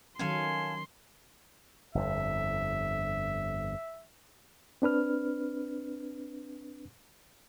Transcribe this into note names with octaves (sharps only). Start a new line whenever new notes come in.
D#3 F#3 C#4 A4 F5 G#5 C6
G1 F2 E5
C4 D4 B4 F6